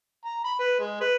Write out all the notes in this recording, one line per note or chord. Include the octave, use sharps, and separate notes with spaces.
A#5
B5
B4
G#3
B4